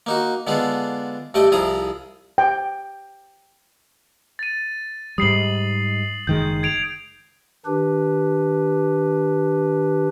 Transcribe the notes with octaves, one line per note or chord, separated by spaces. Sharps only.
A#3 D#4 F#4
D3 G#3 B3 D4 F4 G#4
G2 G3 A3 G4 D#5 G5
C2 F3 E4 G#4 A#5 D#6
G5
A6 D#7
G#2 G3 D#6 C7 F#7
F#1 D#3 G#3 G6
G#6 D7 F7
D#3 D4 G4 B4